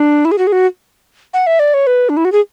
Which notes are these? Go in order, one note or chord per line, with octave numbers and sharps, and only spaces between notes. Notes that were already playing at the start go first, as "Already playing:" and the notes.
Already playing: D4
E4
G#4
F#4
G#4
F#4
F#5
E5
D5
C#5
B4
D4
E4
F#4
G#4